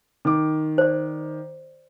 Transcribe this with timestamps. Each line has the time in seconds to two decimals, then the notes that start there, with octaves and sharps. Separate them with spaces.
0.25 D#3 D6
0.78 C5 D5